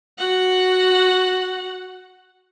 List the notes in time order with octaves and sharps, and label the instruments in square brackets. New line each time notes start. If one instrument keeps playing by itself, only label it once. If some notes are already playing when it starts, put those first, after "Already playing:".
[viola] F#4 F#5